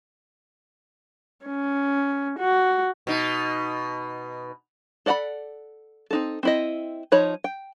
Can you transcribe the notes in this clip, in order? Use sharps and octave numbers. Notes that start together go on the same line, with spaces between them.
C#4
F#4
B2 D#4
A4 D5 F#5 A#5 B5
C4 D#4 A4
C4 E4 D#5
F3 D#4 C#5 B5
G5